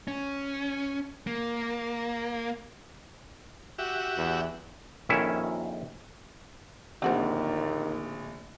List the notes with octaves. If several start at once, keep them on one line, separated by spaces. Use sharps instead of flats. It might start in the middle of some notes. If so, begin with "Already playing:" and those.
C#4
A#3
F#4 G4 E5
E2
A#1 F2 D#3 C#4 E4 E5
D1 A#1 D#2 C4 F#4 C5